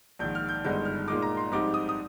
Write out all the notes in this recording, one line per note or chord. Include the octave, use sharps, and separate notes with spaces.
A#1 G#2 D#3 G6
F6
G6
G1 G2 D#3 G#3 D#4 G6
F6
A#2 G#3 D#4 D6
A#5
C6
A#1 G#2 G3 C4 D#4 D6
D#6
D#6